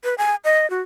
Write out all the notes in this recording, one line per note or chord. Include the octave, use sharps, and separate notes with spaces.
B4
G#5
D#5
F#4